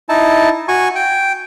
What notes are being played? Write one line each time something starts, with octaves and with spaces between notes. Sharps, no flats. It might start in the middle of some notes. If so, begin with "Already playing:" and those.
D#4 E4 A5
F#4 G#5 C#6
G5